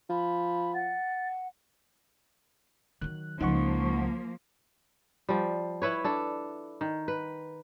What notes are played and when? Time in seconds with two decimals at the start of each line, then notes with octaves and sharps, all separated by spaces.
0.10 F3 B5
0.74 F#5 A6
3.01 D#3 F#3 F#6
3.41 C#2 F3 G#3 A#3 D#4 F#5 C#6
5.29 F3 G3
5.82 E4 B4 C#5
6.04 D4 A4
6.81 D#3
7.08 B4